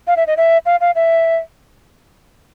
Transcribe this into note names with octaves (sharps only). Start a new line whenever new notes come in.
F5
E5
D#5
E5
F5
F5
E5